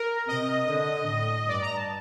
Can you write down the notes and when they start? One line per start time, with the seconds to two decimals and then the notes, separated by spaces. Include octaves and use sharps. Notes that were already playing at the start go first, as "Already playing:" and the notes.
Already playing: A#4
0.28 C3 D#5
0.68 D3
1.08 A2
1.48 G2 D5
1.62 A#5
1.75 A5